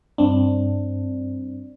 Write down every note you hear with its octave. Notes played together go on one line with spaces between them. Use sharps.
G2 C4 D4